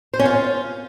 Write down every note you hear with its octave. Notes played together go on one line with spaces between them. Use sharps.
C5
C#4
F4